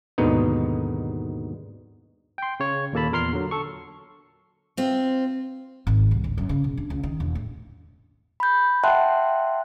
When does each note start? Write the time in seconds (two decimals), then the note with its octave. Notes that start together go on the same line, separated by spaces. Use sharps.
0.18 D#2 G#2 B2 D3 B3 D#4
2.38 G5 C6
2.60 C#3 C#5
2.93 D#2 A#2 A#3 A4 A5 B5
3.12 E2 A#2 A#4 C6 F6 C7
3.33 D3 F#3
3.51 A4 C#6
4.77 C4 F4
5.87 G#1
6.11 C2
6.24 D2
6.38 F#2
6.49 C#3
6.64 B2
6.77 D4
6.90 C#2
7.03 D#3
7.20 E1
7.35 A2
8.40 B5 G6
8.84 E5 F#5 G5 A5 C6 F#6